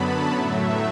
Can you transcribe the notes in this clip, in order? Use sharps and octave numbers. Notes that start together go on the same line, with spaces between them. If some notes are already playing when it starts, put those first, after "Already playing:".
Already playing: F#2 D3 F#3 B3 A5 B5
A2 F#3 A3 E5